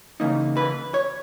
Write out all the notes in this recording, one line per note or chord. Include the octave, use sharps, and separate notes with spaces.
C#3 E3 A#3 D#4
B4
C#5